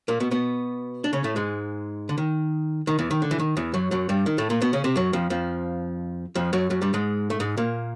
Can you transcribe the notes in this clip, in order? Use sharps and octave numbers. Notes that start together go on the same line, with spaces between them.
A#2 A#3
B2 B3
B2 B3
D4
C#3 C#4
A2 A3
G#2 G#3
D3
D#3
D#3
E2 E3
D#3
D3
E3
D#3
E2 E3
F#2 F#3
F#2 F#3
G2 G3
D#3
A2 A3
A#2 A#3
B2 B3
C#3 C#4
C3 C4
F#2 F#3
F2 F3
F2 F3
F2 F3
F#2 F#3
F#2 F#3
G2 G3
G#2 G#3
A3
G#2 G#3
A#2 A#3